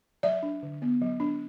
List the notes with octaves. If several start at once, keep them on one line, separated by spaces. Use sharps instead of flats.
F#3 D5 E5
D4
D3
B3
F#3
D4